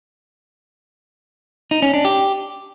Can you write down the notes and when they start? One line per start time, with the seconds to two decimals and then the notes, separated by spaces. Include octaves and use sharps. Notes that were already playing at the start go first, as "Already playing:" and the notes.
1.71 D#4
1.82 C#4
1.94 D4
2.05 G4